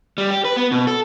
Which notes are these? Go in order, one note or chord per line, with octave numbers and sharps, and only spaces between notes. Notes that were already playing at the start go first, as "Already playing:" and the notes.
G3
G4
B4
B3
B2
A4